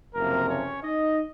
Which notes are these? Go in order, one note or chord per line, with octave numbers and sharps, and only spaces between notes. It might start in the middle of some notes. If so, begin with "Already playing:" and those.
F#1 F2 C3 F3 A#3 A#4
C#4 C#5
D#4 D#5